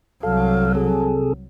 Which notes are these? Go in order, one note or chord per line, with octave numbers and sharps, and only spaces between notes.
C2 F#3 A4 F5
C3 G#4 A4